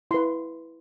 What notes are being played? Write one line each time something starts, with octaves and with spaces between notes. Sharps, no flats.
E4 B4 C6